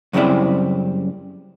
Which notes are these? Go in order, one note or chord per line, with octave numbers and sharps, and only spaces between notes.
F#2 C#3 G3 C4 E4 D5